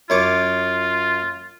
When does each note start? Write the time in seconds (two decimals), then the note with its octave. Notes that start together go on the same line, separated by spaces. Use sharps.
0.10 F#2 F4 C#5 D6